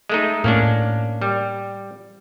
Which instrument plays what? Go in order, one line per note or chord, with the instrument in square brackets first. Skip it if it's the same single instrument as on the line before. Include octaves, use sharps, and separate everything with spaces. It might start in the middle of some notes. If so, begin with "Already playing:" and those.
[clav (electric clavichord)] G#3 A3 D#4
[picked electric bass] A2 [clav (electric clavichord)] A#3 C#4 D4
[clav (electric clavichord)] G3